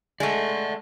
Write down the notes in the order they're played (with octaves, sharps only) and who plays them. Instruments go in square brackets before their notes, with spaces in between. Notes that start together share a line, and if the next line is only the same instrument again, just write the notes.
[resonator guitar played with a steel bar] G#3 A3 [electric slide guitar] D5 F#5